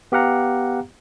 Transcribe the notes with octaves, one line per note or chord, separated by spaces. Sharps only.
B3 G4 F5 F#5 A#5